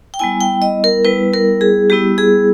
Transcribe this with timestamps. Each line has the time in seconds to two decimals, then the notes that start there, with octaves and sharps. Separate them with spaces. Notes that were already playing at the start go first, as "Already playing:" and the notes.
0.14 G5
0.19 G3 B3 E4 G#5
0.41 G5
0.62 D#5
0.84 A#4
1.05 G3 B3 E4 B4
1.34 A#4
1.61 G#4
1.90 G3 B3 E4 G4
2.18 G#4